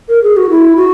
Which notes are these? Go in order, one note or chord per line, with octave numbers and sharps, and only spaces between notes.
A#4
G#4
F#4
E4
F#4